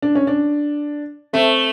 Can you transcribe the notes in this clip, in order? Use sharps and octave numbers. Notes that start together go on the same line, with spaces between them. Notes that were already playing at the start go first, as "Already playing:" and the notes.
D4
C#4
D4
A3 C4